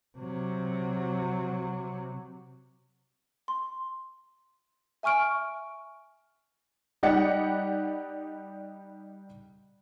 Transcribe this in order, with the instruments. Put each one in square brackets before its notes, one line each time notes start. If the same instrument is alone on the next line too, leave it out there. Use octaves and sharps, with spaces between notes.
[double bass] C3 F#3
[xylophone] C6
E5 G#5 C#6 F6 D7
[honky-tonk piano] G3 D#4 G4 D5 D#5 F#5